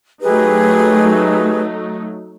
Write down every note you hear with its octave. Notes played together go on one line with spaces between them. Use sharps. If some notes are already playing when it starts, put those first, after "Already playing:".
F#3 A3 D#4 G4 G#4 B4